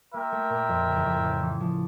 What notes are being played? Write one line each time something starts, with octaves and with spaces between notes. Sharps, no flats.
A#3 F4 A#4 E5 G5
A3
A#2
F2
C#3
E2
F2
A2
C#3
E3
F3